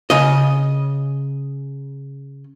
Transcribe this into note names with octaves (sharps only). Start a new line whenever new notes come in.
C#3 D#5